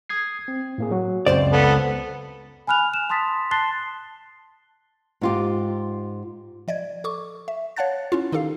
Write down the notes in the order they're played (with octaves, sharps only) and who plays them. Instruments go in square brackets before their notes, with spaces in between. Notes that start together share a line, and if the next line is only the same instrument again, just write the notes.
[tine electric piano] D#6 G#6 C7
C4
A2 A#3 G#4
F#3 F#4
[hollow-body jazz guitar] C#2 C5 D5 [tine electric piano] F#2 C#3 C4
[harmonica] B3 A4
[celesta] G#5 B5 F6 F#6 F7
E7
A5 C6 D#6 A6 B6
A5 C6 F#6 A6 C7 G7
[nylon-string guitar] G#2 F4 G4
[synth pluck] F3 D5 D#5 G#6
A4 C#6 D6
E5
C#5 F5 F#5 A5 F#6 A6
C#4 E4 F4
D#3 D#4 G4 A4 F5 C7